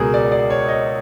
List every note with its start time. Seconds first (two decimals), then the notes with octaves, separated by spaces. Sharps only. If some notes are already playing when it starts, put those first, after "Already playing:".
Already playing: C#2 B2 F#3 B3 G#4 A#4
0.14 D5
0.32 D5
0.50 C#5
0.68 D#5